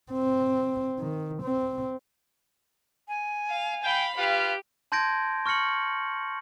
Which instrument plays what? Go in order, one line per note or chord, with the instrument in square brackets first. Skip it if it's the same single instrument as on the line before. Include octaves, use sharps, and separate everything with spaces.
[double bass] C4
D#3
C4
[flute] G#5
[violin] F5
[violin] F5 B5 [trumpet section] G5
[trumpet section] F4 B4 F5 [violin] G4
[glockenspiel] A5 C6 G6 G#6 A#6 D7
C#6 F6 A#6 C#7 F#7